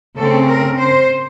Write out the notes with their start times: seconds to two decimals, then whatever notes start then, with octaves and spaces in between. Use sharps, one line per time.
0.17 C#3 A3 C4 A4
0.48 A#4
0.78 C5